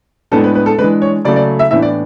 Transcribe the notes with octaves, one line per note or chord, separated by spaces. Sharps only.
A2 G#3 B3 D4 A4
B4
B4
A4
E3 G#3 D4 B4
C#5
C#3 F#3 A3 D5
D5
E5
A2 E3 B3 D4 E5
D5